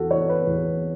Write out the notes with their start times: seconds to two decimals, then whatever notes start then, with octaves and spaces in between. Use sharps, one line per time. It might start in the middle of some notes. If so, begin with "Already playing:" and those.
Already playing: E2 F#4 A4
0.10 E3 C#5
0.29 B4
0.47 E2